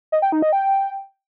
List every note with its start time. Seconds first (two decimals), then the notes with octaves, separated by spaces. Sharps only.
0.12 D#5
0.22 G5
0.32 D#4
0.42 D#5
0.52 G5